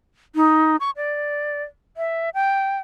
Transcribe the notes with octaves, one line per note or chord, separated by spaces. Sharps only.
D#4
C#6
D5
E5
G5